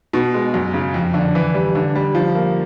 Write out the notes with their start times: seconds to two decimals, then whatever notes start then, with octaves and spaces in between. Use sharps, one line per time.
0.13 B2
0.34 G#3
0.54 F#2
0.74 C#3
0.94 F2
1.14 D3
1.35 E3
1.54 G3
1.75 D3
1.96 G3
2.15 F3
2.35 A#3